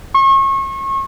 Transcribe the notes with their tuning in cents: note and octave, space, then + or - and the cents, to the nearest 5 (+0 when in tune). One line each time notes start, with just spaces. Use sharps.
C#6 -35